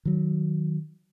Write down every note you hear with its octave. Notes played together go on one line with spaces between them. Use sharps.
D#3 F#3